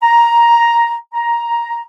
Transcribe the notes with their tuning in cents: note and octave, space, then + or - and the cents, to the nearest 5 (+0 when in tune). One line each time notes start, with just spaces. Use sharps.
A#5 +5
A#5 +10